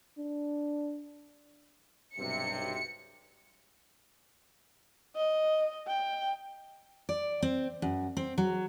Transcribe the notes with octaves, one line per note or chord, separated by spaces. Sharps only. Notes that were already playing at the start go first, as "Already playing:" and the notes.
D4
B1 G2 C3 C#7
D#5
G5
D5
C4
F#2
C4
F#3